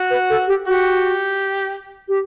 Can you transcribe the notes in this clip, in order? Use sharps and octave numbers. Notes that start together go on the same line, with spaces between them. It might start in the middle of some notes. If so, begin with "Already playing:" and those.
Already playing: F#4
B4
A4
G4
F#4 G4
G4